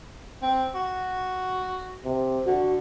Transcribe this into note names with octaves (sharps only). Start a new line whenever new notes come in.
C4
F#4
C3
D3 F#4